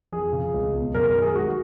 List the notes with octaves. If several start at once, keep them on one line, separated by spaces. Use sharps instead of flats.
F2 G#4
C#3
C#2
B2
F#2 A#4
A#4
D#3
G#4
G#3 F#4